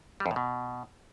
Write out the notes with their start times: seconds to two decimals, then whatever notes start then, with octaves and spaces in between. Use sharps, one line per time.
0.20 G3
0.26 F2
0.31 A2
0.36 B2